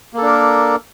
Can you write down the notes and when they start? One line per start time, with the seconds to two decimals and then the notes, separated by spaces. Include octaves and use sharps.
0.13 A#3
0.18 A4
0.22 D4
0.26 A#4